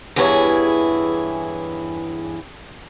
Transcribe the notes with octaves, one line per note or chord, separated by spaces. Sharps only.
E2 G2 E3 E4 G#4 C#5